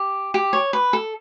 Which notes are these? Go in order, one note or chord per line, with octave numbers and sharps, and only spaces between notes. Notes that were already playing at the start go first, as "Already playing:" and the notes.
Already playing: G4
G4
C#5
B4
A4